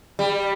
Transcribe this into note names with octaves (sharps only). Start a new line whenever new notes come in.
G3